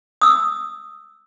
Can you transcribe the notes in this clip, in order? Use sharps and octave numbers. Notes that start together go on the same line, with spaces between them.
D#6 E6